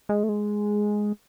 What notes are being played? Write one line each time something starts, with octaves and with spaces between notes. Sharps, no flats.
G#3
A3
G#3